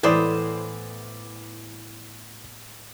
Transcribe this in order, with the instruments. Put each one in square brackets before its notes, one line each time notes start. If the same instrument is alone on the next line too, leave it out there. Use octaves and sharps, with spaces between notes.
[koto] A2 B3 C5 [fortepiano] E3 D5 D#6